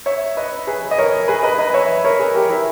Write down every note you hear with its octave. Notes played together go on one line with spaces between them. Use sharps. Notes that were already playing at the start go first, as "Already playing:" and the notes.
C#5 E5
B4 D#5
G#4 B4
D#5
A#4 C#5
G#4 B4
B4 D#5
B4 D#5
C#5 E5
A#4 C#5
G#4 B4
G4 A#4
E4 G#4